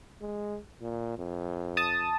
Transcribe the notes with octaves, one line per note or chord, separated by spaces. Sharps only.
G#3
A#2
F2
A5 D#6